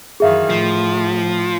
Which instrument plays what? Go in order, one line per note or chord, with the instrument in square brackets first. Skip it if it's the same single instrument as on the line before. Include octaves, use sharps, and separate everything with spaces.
[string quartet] F#2 D#3 E3 [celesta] G#4 E5 F5
[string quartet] A2 [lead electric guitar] F3